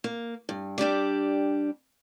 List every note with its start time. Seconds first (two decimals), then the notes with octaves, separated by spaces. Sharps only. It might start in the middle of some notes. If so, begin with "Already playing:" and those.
0.04 A#3
0.49 G2
0.78 G3 D4 G4 D5